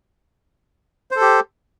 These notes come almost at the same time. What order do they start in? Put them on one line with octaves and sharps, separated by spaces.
C5 A4 G4